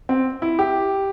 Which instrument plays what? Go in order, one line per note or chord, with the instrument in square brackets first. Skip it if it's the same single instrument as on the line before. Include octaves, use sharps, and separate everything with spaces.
[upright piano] C4
E4
G4